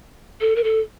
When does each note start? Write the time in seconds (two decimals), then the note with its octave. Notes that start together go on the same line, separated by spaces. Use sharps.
0.41 A4
0.56 A#4
0.64 A4